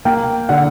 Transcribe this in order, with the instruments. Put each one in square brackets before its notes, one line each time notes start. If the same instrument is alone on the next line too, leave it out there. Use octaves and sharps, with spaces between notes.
[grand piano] A#3 G5
D3 F#5